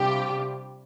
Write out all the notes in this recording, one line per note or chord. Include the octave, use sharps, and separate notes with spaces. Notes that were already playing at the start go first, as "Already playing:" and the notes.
Already playing: C3 G3 D4 F4 G4